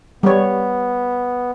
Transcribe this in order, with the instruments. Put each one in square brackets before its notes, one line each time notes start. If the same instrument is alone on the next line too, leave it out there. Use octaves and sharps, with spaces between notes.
[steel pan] G3 C#5 [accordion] B3